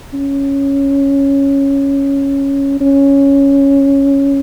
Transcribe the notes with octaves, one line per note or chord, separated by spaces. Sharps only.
C#4
C#4